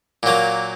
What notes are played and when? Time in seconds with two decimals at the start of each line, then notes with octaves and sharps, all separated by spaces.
0.23 A#2 F#3 A#3